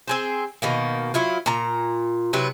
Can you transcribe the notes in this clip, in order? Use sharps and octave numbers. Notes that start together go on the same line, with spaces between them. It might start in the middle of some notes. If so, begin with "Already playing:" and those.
C4 G#4 C5
B2 D#3 A#3
F#3 E4 F4
A#2 A#5
C3 F#3 E4 B4